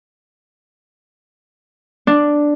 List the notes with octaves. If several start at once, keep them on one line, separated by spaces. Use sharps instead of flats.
D4